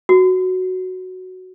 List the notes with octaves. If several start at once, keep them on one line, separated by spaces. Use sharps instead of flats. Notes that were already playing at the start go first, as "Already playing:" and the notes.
F#4